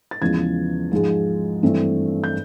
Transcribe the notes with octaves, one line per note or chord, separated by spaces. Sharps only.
A6
E2 C#3 F3 G#3 B3 G#6
G#2 F3 G#3
G2 E3 A3 C4
G6